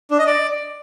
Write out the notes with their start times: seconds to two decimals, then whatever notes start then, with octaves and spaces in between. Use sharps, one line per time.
0.11 D4
0.19 D#5
0.27 D5